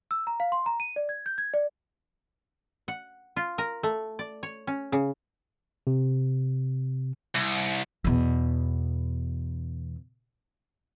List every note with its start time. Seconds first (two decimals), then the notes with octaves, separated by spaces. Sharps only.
0.11 E6
0.27 A#5
0.40 F5
0.52 C6
0.66 A#5
0.80 D#7
0.96 D5
1.09 G#6
1.26 G6
1.38 G#6
1.54 D5
2.88 F#5
3.36 F4
3.58 A#4
3.83 A3
4.19 D5
4.43 C#5
4.67 C#4
4.92 C#3
5.87 C3
7.35 C2
8.04 E2 B2